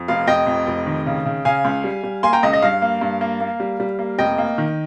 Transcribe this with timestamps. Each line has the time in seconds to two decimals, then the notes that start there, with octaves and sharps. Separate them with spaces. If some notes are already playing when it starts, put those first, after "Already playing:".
Already playing: F2
0.08 F1 F5
0.27 F1 D#5 G5
0.47 F2
0.67 F1
0.86 D#3
1.06 C#3
1.25 C#3
1.45 C#3 F5 G#5
1.65 C#2
1.84 G3
2.04 G3
2.23 A#3 G#5 C6
2.33 G5 A#5
2.43 C#2 D#5
2.53 D#5
2.62 G2 F5
2.82 A#3
3.01 G2
3.21 A#3
3.41 A#3
3.60 G3
3.80 G3
3.99 A#3
4.18 F1 D#5 G5
4.38 A#3
4.58 D#3